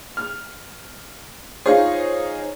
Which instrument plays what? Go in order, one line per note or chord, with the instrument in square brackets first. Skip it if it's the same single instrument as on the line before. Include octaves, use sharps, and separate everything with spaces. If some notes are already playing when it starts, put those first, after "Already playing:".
[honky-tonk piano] F6
[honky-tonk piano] D#4 F4 G#4 [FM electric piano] C5 C#5